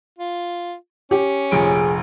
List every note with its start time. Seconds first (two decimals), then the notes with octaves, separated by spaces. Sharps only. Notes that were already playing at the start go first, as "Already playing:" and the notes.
0.19 F4
1.11 C#4 G4
1.52 F1 A#1 G#4 D7